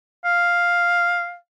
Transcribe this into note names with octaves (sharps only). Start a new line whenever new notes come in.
F5